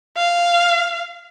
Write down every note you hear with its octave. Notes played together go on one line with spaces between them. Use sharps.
F5